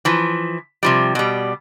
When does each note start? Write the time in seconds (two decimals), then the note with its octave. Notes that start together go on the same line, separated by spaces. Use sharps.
0.05 E3 F3
0.83 C3 F3 G3
1.15 B2 G3